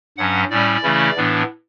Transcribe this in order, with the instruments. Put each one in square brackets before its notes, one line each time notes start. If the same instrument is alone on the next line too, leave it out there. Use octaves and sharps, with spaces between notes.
[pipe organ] G2 F#3 C#4 F#5
A2 G3 C#4 D5
C#3 E3 A3 C#4 E4
A2 E3 B3 D4